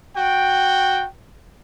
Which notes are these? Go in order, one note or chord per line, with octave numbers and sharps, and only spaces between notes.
F#4 G5